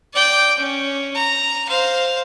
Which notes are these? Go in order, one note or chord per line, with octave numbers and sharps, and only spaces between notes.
D5 G5
C#4
A#5
C5 F5